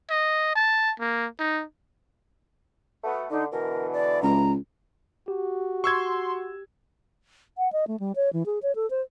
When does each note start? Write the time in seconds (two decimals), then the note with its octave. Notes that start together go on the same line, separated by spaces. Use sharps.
0.10 D#5
0.55 A5
1.00 A#3
1.39 D#4
3.04 A3 B3 F#4
3.31 D3 D#4
3.52 B2 D3 E3 A#4
3.93 D5
4.23 C#2 A#5
5.28 F#4 G4
5.84 C6 C#6 E6 G#6
7.58 F#5
7.73 D#5
7.87 A3
8.00 G3
8.16 C#5
8.33 E3
8.46 G#4
8.63 C#5
8.75 A4
8.90 C5